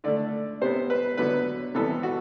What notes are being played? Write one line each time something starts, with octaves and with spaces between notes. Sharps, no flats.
D3 A3 D5
C3 G3 B3 C5
B4
D3 F#3 B3 B4
C3 E3 G3 B3 A4
F#4